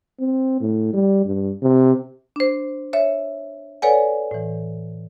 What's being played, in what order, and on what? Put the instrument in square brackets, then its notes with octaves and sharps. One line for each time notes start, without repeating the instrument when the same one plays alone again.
[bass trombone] C4
A2
G3
G2
C3
[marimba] D4 C5
C#5 E5
A4 B4 C#5 D5 F#5 G#5
A2 E3